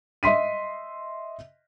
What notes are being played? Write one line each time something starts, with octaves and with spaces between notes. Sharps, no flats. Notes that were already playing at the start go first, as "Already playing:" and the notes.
D#5 E5 C6 B6 D#7